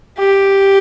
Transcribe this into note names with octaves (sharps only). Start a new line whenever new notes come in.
G4